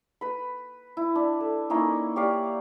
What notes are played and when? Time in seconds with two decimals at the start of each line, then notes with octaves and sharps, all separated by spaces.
0.21 B4 B5
0.97 E4
1.16 D4
1.40 A4
1.70 A#3 C#4 D#4 E4
2.16 G4 C#5 D5 F5